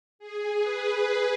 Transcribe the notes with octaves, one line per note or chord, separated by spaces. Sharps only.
G#4
B4